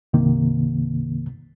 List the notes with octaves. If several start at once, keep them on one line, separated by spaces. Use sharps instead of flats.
C2 G2 C3 D#3 A#3